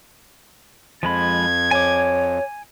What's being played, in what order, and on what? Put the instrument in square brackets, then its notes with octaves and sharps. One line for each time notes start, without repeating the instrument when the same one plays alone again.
[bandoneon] F2 [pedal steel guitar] F3 G#3 B5 [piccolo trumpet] G#6
[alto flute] C#5 [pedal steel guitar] G#5 D6